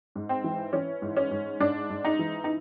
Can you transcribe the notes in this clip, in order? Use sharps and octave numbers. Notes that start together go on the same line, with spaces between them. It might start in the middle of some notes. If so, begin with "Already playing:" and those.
G#2
C4
E3
E3 C#4
G#2
C#4
G#2
G#2 D4
G#2
D#4
E3
D#4